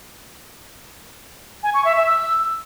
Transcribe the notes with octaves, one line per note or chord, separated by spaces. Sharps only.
G#5
C#6
E5
E5
E6